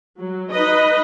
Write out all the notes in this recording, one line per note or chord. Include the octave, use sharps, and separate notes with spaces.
F#3
D#4 B4 D#5